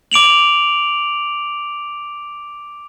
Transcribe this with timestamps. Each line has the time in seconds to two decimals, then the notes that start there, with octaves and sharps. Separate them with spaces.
0.12 D6 D7 F7 F#7